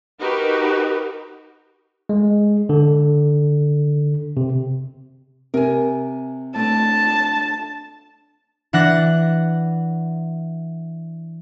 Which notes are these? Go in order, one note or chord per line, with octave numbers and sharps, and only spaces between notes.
D#4 F#4 G4 A#4 B4
G#3
D3
C3
C3 A#4 G#5
A3 D4 A5
E3 D4 F#5 F#6 A#6